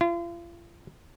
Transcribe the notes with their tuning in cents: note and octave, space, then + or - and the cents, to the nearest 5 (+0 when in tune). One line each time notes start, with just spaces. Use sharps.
F4 -40